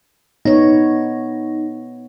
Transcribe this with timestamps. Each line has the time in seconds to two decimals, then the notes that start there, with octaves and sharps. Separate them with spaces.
0.45 B3 D#4 C#5